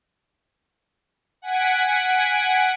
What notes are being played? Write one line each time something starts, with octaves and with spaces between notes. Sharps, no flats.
F#5 G#5 B6 D7